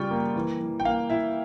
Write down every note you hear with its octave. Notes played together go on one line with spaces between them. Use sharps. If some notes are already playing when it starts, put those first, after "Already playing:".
Already playing: C#3 G3 F4 G5 C#6
A#3
E3
E3
G5
A#3 F5
E4 E5